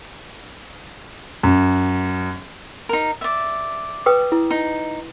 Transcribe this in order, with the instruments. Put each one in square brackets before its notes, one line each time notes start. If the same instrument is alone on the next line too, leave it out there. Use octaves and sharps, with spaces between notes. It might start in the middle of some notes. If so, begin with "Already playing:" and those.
[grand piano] F#2
[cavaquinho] D#4 A#4
D5 E5
[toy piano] B4 G5 D#6
E4
[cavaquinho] D#4